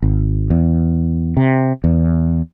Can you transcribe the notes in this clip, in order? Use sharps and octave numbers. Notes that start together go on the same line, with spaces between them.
G#1
E2
C3
E2